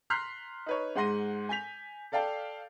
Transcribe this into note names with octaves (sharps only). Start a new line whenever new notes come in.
A#5 C6 F6 F#6 B6 C7
D#4 B4 C#5
G#2 G#3 F#5 C6 A#6 D#7
G#5 G6 B6 F7
A4 D5 F5 G5 A5